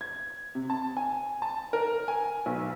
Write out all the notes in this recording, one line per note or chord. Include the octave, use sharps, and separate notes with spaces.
G#6
C3
A5
G#5
A5
A#4
G#5
B1